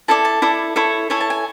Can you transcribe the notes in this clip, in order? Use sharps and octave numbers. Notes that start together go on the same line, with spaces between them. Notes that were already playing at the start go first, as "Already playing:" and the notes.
E4 A4 D5 A5
A5
E4 A4 D5
E4 A4 C#5
E4 A4 C#5 G#5
A5
G#5